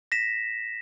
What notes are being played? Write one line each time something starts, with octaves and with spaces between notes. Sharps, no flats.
A#6 B6 E7